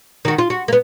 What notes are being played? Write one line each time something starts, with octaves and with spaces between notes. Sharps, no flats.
D#3 F#4
F4
F#4
A#3 B3